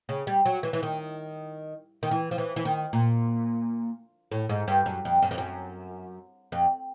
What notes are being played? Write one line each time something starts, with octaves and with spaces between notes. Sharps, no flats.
C#3
G3
F#3
E3
E3
D#3
D#3
E3
F3
E3
E3
D#3
A#2
A2
G#2
G2
F#2
F2
F#2
F2
F#2
F2